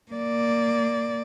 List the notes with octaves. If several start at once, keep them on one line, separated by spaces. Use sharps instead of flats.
A#3 D5